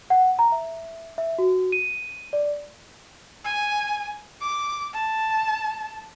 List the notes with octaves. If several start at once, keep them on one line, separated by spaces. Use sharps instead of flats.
F#5
A#5
E5
E5
F#4
D#7
D5
G#5
D6
A5